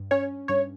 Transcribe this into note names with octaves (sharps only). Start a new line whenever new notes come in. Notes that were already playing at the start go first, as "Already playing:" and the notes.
Already playing: G2
C#4 C#5
G2 C#5